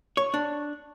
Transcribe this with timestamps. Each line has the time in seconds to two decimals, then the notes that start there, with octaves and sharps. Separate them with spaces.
0.17 C#5
0.34 D4